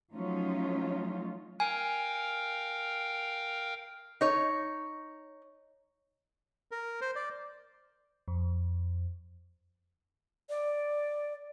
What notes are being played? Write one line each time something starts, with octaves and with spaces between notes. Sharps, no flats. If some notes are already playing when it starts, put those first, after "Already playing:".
F3 F#3 A3 C#4 D#4 F4
A#4 F5 G5 G#5
D#4 C#5
A#4
C5
D5
F2
D5